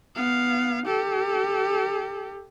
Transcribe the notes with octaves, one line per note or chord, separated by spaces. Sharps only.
B3 F5
G4 A4